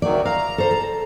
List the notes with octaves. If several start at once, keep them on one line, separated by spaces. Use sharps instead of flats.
D2 D#3 F#3 C#5 D5
F5 A#5
A4 C5
A4